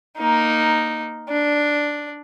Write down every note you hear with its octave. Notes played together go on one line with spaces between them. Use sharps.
A#3 D#4
D4